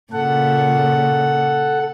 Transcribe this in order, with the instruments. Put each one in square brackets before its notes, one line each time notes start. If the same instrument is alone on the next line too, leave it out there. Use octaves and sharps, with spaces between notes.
[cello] A#2 C#3 [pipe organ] A4 F#5